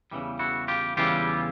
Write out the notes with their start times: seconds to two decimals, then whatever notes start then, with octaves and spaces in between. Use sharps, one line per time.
0.11 E2 C#3 E3 G3
0.39 E4 F#4
0.68 F4 G4
0.97 E2 C#3 E3 G3 F4 G4